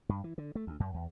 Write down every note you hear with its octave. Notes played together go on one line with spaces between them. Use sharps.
G2
E3
D3
A3
D2
F#2
E2